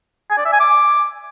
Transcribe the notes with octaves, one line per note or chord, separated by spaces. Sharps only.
G#5
D5
E5
G#5
D6